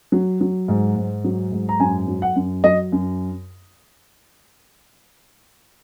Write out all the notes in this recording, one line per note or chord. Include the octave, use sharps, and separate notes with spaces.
F#3
F#3
G#2
G#2
F#3
G#2
A#5
F#2 G#5
F#3
F#5
F#2
F#3 D#5
F#2